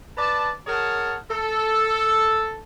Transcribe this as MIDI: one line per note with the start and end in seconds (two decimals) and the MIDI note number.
0.17 0.50 71
0.17 0.50 74
0.17 0.50 81
0.67 1.15 68
0.67 1.15 70
0.67 1.15 73
0.67 1.15 78
0.67 1.15 81
1.30 2.62 69